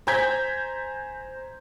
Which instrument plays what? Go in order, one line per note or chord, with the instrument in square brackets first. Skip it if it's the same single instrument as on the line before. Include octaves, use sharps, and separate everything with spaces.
[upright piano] C5 G#5 A#5 G6 G#6 B6